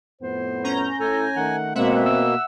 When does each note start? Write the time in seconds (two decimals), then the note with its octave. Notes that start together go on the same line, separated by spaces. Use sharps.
0.22 F2 A2 B3 C5
0.64 C#4 A#5 G6
1.00 A2 A4 G#5
1.36 D#3 A3 F#5
1.75 B2 G#3 A#3 C4 E5 F#5
2.06 E6